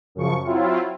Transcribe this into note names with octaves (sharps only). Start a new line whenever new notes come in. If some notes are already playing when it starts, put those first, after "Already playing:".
F#2 C#3 F3 C#6
F#3 C4 E4 F4